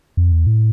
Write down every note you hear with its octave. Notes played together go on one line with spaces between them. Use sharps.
F2
E2
A2